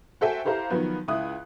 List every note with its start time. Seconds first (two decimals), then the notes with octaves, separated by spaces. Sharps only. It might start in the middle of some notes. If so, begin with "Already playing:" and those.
0.21 F#4 A4 C5 E5 G5 G#5
0.45 E4 G4 A4 C5 F5 A#5
0.70 D#3 F3 F#3 B3
1.08 C#2 E4 D#6 F#6